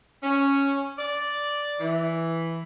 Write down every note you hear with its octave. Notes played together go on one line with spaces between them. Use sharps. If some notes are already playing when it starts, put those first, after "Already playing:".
C#4
D5
E3